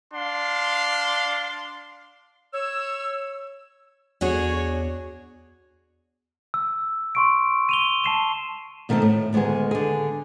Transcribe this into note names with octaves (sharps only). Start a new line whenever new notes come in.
D4 F5 C6
C#5 E6
E2 D4 F#4 G#4 C#5
E6
C6 C#6 D7
D#7 F7 G7
A5 C7 E7
B2 D#3 A3 C4 A4
A2
D2 D#3 G#3 B3 G#4
D3 G#4